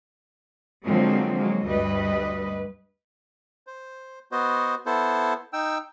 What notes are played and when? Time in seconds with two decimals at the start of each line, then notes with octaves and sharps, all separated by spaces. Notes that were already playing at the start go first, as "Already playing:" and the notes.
0.87 D3 F3 F#3 G#3 A#3 C4
1.37 F#3 G#3 A#3
1.68 D2 G2 G3 B4 D#5
3.67 C5
4.32 B3 F#4 C5 D#5
4.86 B3 E4 A4 C5
5.53 D#4 G5 E6